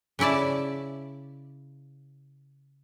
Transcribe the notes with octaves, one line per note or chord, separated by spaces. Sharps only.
C#3 C#4 E4 D5 A5